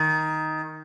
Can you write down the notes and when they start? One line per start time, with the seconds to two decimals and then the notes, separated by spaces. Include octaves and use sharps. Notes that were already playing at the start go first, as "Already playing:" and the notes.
Already playing: D#3